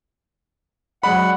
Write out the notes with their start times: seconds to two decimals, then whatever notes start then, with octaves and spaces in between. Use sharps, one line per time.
1.03 F#3 G#3 D5 F#5 B5